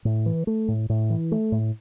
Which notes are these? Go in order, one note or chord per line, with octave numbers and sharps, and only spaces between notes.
A2
E3
A3
A2
A2
E3
A3
A2